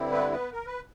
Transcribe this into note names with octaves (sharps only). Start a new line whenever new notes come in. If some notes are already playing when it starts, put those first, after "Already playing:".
Already playing: G2 D3 G3 C4 E4
B3 B4
B3 B4
A#4
B4